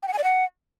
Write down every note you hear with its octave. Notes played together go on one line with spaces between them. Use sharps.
G5
F#5
G#5
D5
F#5